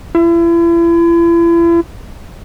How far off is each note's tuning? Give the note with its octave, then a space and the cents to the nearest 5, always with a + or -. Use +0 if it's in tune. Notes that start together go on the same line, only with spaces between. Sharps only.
E4 +40